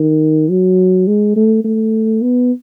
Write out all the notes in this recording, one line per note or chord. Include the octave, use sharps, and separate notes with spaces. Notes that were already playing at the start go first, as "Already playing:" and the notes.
Already playing: D#3
F#3
G#3
A3
A3
B3